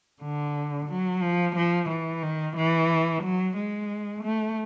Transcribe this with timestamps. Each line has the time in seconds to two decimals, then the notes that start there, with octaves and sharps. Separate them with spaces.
0.22 D3
0.89 F#3
1.22 F3
1.56 F3
1.90 E3
2.23 D#3
2.57 E3
3.23 F#3
3.57 G#3
4.23 A3